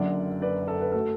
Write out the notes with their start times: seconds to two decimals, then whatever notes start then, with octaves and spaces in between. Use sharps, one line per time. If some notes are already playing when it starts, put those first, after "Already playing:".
Already playing: F#1 F#2 D3 D5 F#5
0.42 B4 D5
0.68 A4
0.81 B4
0.92 F#3 A3 A4